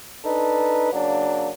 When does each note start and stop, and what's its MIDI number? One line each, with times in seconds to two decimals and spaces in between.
0.25 0.90 62
0.25 0.90 63
0.25 0.90 69
0.25 0.90 71
0.92 1.49 49
0.92 1.49 54
0.92 1.49 58
0.92 1.49 62